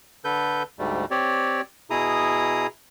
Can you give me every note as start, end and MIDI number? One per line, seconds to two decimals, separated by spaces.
0.25 0.63 50
0.25 0.63 69
0.25 0.63 71
0.25 0.63 91
0.79 1.05 38
0.79 1.05 44
0.79 1.05 55
0.79 1.05 57
1.11 1.61 60
1.11 1.61 67
1.11 1.61 73
1.11 1.61 74
1.90 2.67 47
1.90 2.67 64
1.90 2.67 68
1.90 2.67 82
1.90 2.67 87